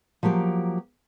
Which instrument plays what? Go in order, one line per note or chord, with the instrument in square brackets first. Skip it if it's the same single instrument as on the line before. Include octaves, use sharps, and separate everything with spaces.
[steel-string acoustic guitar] F3 F#3 A#3 G4